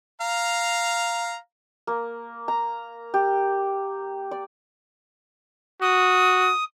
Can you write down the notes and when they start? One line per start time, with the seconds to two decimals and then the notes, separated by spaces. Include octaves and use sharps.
0.21 F5 A#5
1.87 A#3
2.48 A#5
3.14 G4
4.31 D5
5.81 F#4 D#6